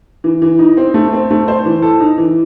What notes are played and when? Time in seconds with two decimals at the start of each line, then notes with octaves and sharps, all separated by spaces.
0.24 E3
0.42 E3
0.59 D#4
0.77 C4
0.94 A3
1.13 C4
1.31 A3
1.48 C5
1.65 E3
1.82 A4
2.00 D#4
2.18 E3